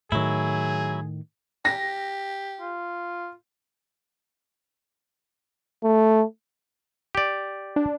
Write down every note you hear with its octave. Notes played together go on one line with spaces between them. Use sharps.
A2 D#3 F#3 E4 G#4
G4 A#6
F4
A3
G4 D5
D4